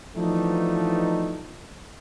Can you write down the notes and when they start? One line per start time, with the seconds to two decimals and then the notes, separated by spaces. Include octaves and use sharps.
0.17 E3 F3 A3 B3 D4 D#4